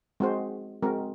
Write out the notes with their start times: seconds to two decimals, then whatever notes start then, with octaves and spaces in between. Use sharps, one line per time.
0.20 G#3 C4 F#4 C5
0.82 G#3 C4 F#4 A#4